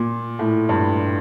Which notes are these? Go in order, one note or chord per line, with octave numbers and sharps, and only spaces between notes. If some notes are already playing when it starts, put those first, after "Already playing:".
Already playing: A#2
A2
G2